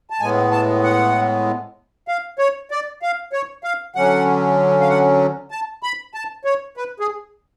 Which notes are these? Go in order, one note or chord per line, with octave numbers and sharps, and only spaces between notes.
A5
A2 G#3 B3 G#5
A5
F#5
F5
C#5
D5
F5
C#5
F5
D3 F#3 C#4 F#5
F5
F#5
A5
B5
A5
C#5
B4
G#4